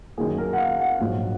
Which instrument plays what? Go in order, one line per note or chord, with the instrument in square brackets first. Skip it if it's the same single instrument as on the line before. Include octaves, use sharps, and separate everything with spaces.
[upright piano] F#2 D#3 F#3 A#3 G#4
A#4
F#5
F5
F#5
A#1 G#2 F#3 A#3